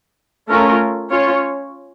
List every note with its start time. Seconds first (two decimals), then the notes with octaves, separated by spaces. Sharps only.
0.49 A3 C#4 F4 A#4
1.10 C#4 F4 C#5